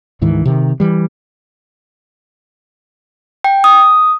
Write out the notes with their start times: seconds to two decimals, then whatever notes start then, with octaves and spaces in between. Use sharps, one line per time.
0.21 D2 G#2 D#3 E3
0.45 C3 D#3
0.80 E3 G3
3.44 G5
3.64 D#6